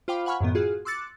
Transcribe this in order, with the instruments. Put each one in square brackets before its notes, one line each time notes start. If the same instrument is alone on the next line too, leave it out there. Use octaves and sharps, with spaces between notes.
[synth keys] F4 C5 F5 G5 B5 D6
F5 F#5 G#5 B5 C#6 F6
F#2 A2 D#3 B3
F4 F#4 G#4
C6 D6 E6 F#6 A6 C#7